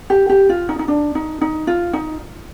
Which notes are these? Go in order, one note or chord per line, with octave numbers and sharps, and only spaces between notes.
G4
G4
F4
D#4
D#4
D4
D#4
D#4
F4
D#4